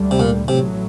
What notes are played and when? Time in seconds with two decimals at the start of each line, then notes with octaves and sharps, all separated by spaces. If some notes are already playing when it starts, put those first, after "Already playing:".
Already playing: D2 D3 G3
0.11 C3
0.20 A#2
0.48 A1 A2 C3 F#3